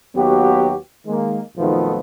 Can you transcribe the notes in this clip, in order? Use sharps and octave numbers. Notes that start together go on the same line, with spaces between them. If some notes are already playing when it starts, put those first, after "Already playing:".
D#2 F#3 B3 F#4 G4
D#3 G#3 A#3
B1 F2 D#3 F3 A3 B3